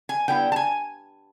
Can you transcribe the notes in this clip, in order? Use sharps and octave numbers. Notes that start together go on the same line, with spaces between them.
G#5
D3 G3 B3 E4 G5
A5
G#5